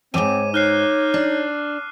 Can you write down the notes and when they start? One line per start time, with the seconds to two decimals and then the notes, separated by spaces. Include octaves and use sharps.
0.14 F2 G#2 C4 C#5 D6 D#7
0.54 D#4 C#5 F6 F#6 C7
1.14 D4